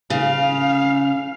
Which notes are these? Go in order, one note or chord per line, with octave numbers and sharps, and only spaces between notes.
C#3 F5